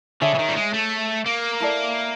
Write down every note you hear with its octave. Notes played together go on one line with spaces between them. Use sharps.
D3 G#4 C#5 E5 G#5
E3
D#3
G3
G#3
A3
A#3
E4 A4 D5